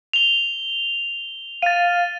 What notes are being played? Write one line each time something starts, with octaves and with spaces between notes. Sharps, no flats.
F7 G7
F5 A6 D#7